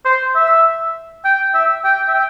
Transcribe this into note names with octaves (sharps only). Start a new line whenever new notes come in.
C5
E5
G5
E5
G5
E5
G5